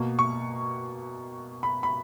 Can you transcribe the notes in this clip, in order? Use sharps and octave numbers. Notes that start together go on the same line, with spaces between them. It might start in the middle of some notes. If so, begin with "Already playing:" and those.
Already playing: B2 A#3
C#6
B5
B5